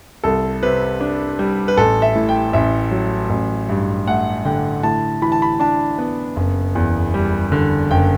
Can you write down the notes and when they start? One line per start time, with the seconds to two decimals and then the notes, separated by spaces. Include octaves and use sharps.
0.24 C2 A4
0.63 C3 B4
1.01 D4
1.39 G3
1.68 B4
1.77 A1 A4
2.02 E5
2.15 A2
2.29 G5
2.53 A1 E5
2.91 F#3
3.30 A1
3.69 G2
4.07 A3 F#5
4.45 D3 G5
4.83 A2 A5
5.22 E3 B5
5.32 A5
5.42 B5
5.60 D4 A5
5.98 B3
6.36 F#1
6.75 E2
7.14 G3
7.52 D3
7.91 F#1 G5